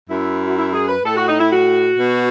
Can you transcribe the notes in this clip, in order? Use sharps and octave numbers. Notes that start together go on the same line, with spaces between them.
F#2 E4
F#4
E4
G#4
B4
A2 A4
F#4
D#4
E4
F#4
B2